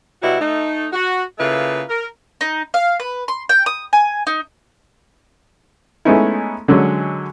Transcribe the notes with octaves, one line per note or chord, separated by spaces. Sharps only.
B2 F#3 G3 E4 F#4
A3 D#4
F#4
C#3 A3 A#3 E4 F4 B4
A#4
D#4
F5
B4
C6
G5
D#6
G#5
D#4
G#3 A3 B3 C#4 D#4 E4
D3 F#3 G#3 C#4